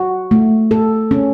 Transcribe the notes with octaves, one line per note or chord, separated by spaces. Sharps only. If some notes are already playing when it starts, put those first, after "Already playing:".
Already playing: F#4
A3
A4
C#4